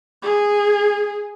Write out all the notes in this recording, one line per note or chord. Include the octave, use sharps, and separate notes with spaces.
G#4